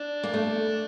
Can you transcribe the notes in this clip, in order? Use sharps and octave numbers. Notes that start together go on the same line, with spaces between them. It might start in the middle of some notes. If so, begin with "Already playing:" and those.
Already playing: D4
A#3
A3